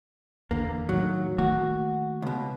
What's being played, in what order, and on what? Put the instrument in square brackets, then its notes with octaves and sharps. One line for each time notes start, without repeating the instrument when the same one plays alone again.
[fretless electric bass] E2 D3 [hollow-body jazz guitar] A#3
[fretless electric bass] A2 D#3 [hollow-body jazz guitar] F#3
[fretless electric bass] D#3 A3 A#3 [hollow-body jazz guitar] F#4
[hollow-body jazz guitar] C#2 B2